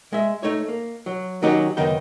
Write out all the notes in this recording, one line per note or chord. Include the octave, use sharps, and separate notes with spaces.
G#3 E5
A3 D#4 C#5
A#3
F#3
D#3 F#3 C#4 D#4 F#4 G4
C#2 F#2 D#3 B3 D#4 G5